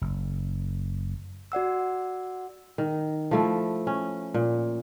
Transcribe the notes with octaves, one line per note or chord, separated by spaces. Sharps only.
F#1
F#4 D5 F#5 E6
D#3
F3 A3 E4
C#4
A#2